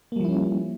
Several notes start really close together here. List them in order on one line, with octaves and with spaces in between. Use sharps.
A#3 G3 F3 E4 C#4